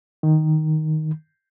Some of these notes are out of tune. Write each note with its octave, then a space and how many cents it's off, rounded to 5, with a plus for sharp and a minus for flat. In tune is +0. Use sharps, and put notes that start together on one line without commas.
D#3 +0